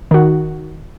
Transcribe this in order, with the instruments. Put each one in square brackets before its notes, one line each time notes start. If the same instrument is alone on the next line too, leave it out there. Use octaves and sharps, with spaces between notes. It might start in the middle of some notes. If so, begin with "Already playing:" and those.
[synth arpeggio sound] D#3 F#4